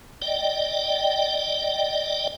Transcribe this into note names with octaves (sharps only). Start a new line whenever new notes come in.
D5 D#5 G5